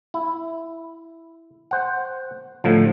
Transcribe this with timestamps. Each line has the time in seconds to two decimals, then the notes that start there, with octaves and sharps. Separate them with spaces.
0.14 E4
1.71 C5 F#5
2.64 A2 D3 F3